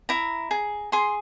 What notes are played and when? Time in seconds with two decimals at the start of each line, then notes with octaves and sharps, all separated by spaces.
0.09 E4 A#5
0.51 G#4
0.92 G#4 C6